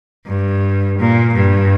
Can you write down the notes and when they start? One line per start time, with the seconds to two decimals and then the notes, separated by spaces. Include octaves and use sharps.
0.26 G2
0.99 A#2
1.34 G2